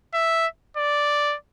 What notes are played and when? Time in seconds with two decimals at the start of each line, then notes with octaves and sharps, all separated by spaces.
0.14 E5
0.77 D5